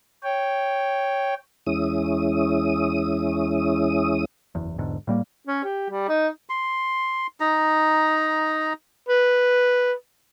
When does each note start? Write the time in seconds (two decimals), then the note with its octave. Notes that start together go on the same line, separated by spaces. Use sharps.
0.23 C#5 G5
1.66 E2 G#3 C#4 E4 D#6
4.55 F#1 E2
4.78 B1 E2 G#2 D3
5.07 A2 G3 A#3
5.47 C#4
5.64 G4
5.90 G3
6.08 D#4
6.49 C6
7.40 D#4 A#5
9.08 B4